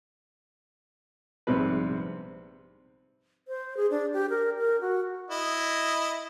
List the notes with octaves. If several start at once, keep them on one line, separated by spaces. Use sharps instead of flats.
A#1 G#2 C3 G3 C4 B4
C5
G#4
D4
G4
A#4
A#4
F#4
E4 D#5